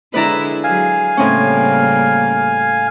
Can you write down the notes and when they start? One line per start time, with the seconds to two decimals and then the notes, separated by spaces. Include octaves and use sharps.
0.14 D3 G#3 E4 B4 D5 A#5
0.64 F#3 G#4 F5 G#5
1.17 A2 C#3 G3 A#3 C4 C#4